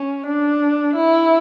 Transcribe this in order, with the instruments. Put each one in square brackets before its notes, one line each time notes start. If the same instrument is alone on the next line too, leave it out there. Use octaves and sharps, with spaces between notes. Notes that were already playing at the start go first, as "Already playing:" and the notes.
Already playing: [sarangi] C#4
D4
E4